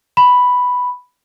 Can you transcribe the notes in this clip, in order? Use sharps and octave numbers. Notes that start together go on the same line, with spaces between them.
B5